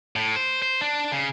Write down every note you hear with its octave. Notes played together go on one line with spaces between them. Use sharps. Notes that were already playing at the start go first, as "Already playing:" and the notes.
A2
C5
C5
D4
C#3